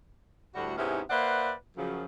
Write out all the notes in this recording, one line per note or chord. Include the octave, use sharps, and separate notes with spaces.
D2 A2 G3 F#4
G#2 C3 B3 C#4 D#4 E4
A#3 B4 C5 D5 E5 F#5
F#2 C#3 F3